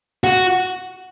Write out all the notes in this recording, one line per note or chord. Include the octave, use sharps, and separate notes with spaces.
F#4